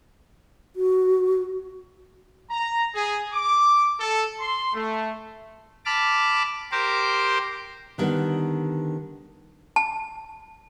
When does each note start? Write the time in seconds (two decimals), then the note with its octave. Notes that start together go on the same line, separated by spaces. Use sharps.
0.76 F#4
2.50 A#5
2.95 G#4
3.33 D6
3.99 A4
4.40 C6
4.73 A3
5.86 A5 B5 D6 F6
6.72 G4 A#4 C5 C6 D6
7.98 D3 D#3 G3 B3
9.76 A5